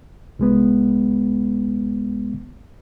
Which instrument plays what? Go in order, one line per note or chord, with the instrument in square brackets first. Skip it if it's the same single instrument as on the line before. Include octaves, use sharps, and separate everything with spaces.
[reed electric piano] C2 G#3 B3